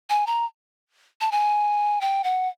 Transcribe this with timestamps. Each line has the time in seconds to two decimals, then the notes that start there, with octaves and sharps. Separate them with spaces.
0.10 G#5
0.27 A#5
1.21 A5
1.32 G#5
2.01 G5
2.24 F#5